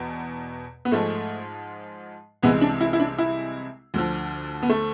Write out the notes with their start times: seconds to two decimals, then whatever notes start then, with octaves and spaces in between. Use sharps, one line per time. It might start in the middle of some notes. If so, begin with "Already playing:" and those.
Already playing: E2 B2
0.85 B3
0.91 G#2 F3 G#3 A3
2.43 C2 C3 E3 G#3 B3
2.61 D4
2.81 E4
2.93 E4
3.00 D4
3.18 E4
3.94 D2 D3 F3
4.63 B3
4.69 A3